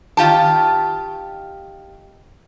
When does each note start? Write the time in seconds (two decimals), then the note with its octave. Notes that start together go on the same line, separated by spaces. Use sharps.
0.17 D#3 F4 G4 A5